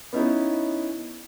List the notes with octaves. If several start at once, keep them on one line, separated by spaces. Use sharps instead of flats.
B3 C#4 D#4 E4